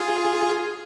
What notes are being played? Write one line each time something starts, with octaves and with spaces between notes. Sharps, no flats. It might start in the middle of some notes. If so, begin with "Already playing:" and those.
Already playing: F4 G#4